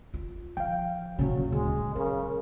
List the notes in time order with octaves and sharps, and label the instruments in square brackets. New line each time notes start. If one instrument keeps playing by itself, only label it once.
[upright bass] F4
[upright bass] F3 [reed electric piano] F5 G5
[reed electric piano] D#2 A#2 C#3 [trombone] F#3 [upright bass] A#3 C#4
[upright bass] D1 [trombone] G#3
[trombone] C#3 [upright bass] F#3 [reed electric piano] A#4